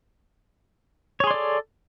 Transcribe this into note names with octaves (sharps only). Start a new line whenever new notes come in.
G#4 A4 C#5 D5 C6